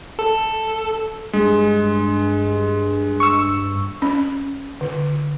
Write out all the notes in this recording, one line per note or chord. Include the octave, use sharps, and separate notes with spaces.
A4
G2 G#3
C#6 E6
C#4
D3